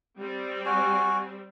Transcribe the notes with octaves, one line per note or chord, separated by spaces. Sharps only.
G3 C4
F#4 G#5